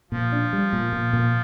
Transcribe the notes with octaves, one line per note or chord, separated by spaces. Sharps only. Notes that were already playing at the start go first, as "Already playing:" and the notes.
A#2 F3
D4
G3
A#2
A#2
A#2